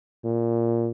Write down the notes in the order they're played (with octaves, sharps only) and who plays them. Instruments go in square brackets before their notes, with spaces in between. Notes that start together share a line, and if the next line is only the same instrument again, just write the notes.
[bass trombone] A#2